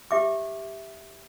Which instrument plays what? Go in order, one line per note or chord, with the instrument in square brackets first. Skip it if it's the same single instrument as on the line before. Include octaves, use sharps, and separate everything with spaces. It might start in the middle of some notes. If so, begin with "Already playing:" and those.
[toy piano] G4 E5 D6